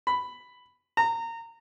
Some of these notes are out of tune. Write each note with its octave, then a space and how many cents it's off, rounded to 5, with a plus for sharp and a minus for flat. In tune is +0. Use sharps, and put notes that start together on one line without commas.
B5 +5
A#5 -25